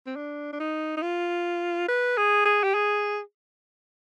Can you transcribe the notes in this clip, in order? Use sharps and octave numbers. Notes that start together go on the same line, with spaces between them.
C4
D4
D4
D#4
D#4
F4
B4
G#4
G#4
G4
G#4